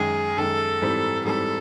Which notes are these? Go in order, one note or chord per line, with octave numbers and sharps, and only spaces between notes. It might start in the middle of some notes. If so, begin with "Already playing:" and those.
Already playing: F#2 D#3 G#3 G#4
F#2 D#3 G#3 A4
G#2 E3 G3 C4
G#2 E3 G3 C4 A4